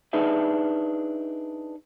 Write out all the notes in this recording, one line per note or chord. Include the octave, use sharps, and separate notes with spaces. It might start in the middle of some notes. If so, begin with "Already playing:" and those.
D4 D#4 G#4 B4 E5